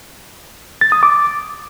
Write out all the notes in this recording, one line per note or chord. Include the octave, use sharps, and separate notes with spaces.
A6
D#6
D6